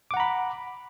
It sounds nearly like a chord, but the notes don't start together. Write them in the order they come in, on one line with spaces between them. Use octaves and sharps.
D6 F#5 A#5 B5